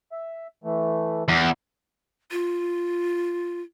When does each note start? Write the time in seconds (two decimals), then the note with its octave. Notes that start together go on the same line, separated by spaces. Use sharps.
0.12 E5
0.64 E3 A3
1.28 E2
2.31 F4